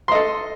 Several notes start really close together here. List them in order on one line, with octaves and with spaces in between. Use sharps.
C6 D#5 A4